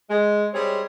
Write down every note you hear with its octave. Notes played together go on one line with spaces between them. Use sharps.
G#3
G3 G#3 C4 G#4 C#5